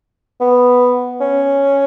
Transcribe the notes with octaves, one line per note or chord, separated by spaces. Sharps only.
B3
C#4